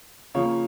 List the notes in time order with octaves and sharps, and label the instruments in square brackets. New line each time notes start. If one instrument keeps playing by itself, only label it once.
[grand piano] C#3 F3 A#3 C#5